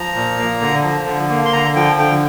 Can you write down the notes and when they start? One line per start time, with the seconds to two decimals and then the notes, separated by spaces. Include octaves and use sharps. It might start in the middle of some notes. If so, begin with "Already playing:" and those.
Already playing: F3 A#5
0.15 A#2
0.38 A#3
0.61 D3
0.84 F3
1.06 D3
1.29 A#3
1.46 C6
1.53 D3 A#5
1.75 F3 G5
1.98 D3 G5